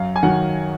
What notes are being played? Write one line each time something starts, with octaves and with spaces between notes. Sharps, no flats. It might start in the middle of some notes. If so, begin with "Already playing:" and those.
Already playing: F#2 F5
G#5
D#3 F#3 F#5